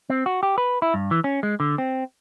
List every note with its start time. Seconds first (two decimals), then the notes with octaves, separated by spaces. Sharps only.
0.10 C4
0.26 F#4
0.43 G4
0.58 B4
0.82 E4
0.94 G2
1.11 E3
1.24 C#4
1.43 G#3
1.60 D3
1.78 C4